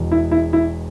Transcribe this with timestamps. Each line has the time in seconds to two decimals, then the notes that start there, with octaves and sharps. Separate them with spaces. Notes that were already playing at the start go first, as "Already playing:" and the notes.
Already playing: E1 E2 B2
0.11 E4
0.31 E4
0.53 E4